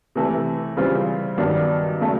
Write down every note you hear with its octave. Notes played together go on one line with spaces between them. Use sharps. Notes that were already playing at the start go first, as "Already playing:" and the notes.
C3 E3 A3
C#3 E3 G3 C4 F4
G2 D#3 F#3 B3 D4
C#3 F#3 A3